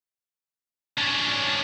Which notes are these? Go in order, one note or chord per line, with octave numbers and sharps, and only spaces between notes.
C#4 D4